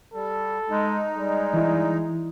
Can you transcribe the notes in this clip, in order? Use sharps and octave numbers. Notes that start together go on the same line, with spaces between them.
G3 A4
G#3 D#4
G3 G#3
E3 E4